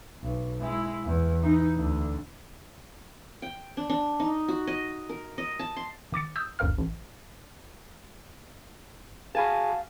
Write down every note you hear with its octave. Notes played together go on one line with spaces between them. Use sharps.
B1
G#3 E4
E2
E3 D#4
D2 D3
G5
D4
D4
D#4
F#4
D#5
A#4
D#5
A5
C6
D#3 D6 A6 C#7
D#6 E6 G6
G1 D2 G2 A#4 F5 F6
A1
F#4 G#4 F5 G#5 A5 B5